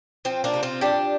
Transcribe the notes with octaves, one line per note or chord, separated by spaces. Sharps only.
F3 C4
A#3 D4
C3
C4 F4
F3 D4 G4